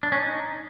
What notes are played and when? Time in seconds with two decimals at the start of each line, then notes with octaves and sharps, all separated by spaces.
0.03 D4
0.12 C#4
0.21 D#4